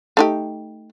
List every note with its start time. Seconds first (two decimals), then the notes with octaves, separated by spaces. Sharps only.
0.17 A3 D#4 G4